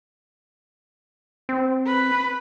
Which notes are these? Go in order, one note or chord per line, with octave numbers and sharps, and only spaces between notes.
C4
B4